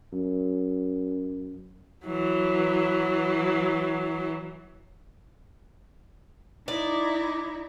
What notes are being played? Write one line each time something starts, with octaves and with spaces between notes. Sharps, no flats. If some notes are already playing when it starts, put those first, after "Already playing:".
F#2
E3 F#3
D#4 E4 D5